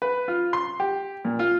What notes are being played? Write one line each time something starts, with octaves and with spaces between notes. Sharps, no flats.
B4
F4
C6
G4
A#2
F4